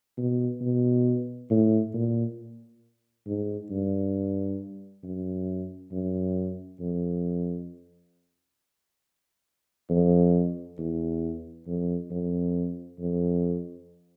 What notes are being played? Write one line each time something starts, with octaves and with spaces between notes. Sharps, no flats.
B2
B2
A2
A#2
G#2
G2
F#2
F#2
F2
F2
E2
F2
F2
F2